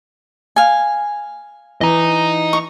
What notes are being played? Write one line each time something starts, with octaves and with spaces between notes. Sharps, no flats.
F5 G#5
E3 D#5 A#5
C#6